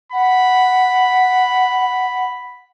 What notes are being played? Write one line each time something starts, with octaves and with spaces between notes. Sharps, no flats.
F#5 B5